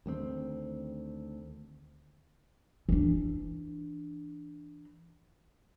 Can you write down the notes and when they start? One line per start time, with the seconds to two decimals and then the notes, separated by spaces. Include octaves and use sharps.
0.06 D2 D#3 G3 C4
2.89 E3 D4